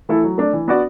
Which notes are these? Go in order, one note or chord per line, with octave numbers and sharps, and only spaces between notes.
E3 A3 E4 A4
F#3
A3 D4
E3
B3 D4 F#4 D5